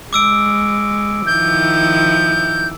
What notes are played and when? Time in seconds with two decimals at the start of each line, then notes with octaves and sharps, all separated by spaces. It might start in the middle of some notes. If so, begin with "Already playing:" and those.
0.13 G#3 D6 E6 D7
1.27 D#3 F3 E4 G6